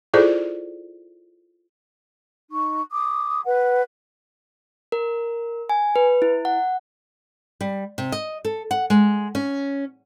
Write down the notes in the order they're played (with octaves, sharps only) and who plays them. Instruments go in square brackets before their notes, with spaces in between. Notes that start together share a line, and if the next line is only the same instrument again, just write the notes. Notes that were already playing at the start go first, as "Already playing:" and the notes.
[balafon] E4 F4 G#4 A4 C5 D5
[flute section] D#4 C#6
D6 D#6
B4 F#5
[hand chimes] A#4
G#5
B4
E4
F#5
[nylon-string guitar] G3
C3
D#5
A4
F#5
G#3
C#4